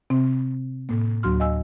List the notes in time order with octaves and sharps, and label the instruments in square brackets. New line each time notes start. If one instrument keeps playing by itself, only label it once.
[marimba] C3 C4
A2 A#3
D2 F#3 F#4 C6 F6
D#5 F5 G#5 E6